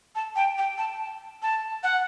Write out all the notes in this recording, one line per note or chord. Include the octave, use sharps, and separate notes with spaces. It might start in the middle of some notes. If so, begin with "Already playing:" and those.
A5
G5
G5
A5
A5
F#5